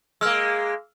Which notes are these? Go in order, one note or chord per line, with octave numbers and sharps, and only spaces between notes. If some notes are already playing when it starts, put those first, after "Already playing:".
G#3 A#3 E6 F6